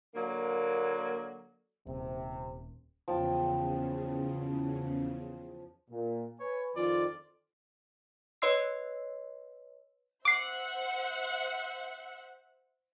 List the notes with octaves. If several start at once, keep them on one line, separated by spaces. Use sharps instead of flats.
D3 F#3 A#3
D#1 C3
E2 C#3 F3 G5 A5
A#2
B4 C#5 G#5
F2 D#3 F4 D5
B4 C#5 D#5 C6 E6 C7
C5 E5 F#5 D6 C7